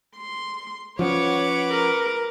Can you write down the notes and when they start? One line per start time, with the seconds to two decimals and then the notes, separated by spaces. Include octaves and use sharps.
0.17 C6
0.99 F3 C#4 B4 C#5 F#5 D6
1.70 A#4